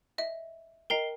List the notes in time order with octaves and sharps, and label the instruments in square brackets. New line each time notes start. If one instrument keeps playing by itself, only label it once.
[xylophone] D#5 E5
[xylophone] A#4 G5 A#5 [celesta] D#5 C7 G7